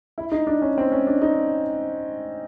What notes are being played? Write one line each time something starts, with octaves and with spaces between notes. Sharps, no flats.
E4
D#4
D4
C#4
C4
C#4
D4
D#4